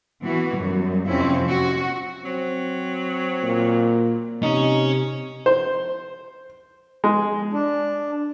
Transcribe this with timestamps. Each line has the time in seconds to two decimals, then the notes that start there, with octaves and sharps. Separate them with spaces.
0.22 E3 B3 F#4
0.54 F#2 G3
1.06 F2 C3 C4 C#4 E4
1.47 C#4 F#4
2.25 F#3 C4
3.43 A#2
4.43 C3 C#4 D#4 C#5
5.46 C5
7.04 G#3
7.51 D4